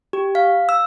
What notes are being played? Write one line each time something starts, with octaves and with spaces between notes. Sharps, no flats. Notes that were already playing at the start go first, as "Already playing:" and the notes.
G4
F5
E6